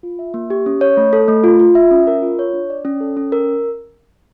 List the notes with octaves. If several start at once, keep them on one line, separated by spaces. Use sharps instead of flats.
F4
E5
A#3
G4
C#4
C#5
A3
A4
A3
F4
F4
E5
C#4
A#4
F4
C#5
D4
D5
C#4
A4
C#4
A#4